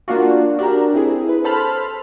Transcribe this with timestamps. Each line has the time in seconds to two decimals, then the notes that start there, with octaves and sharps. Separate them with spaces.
0.08 A#3 D4 F4 F#4
0.59 D4 F#4 G4 A#4
0.94 C4 E4 G#4
1.29 B4
1.44 A4 C5 A5 B5 C6 F6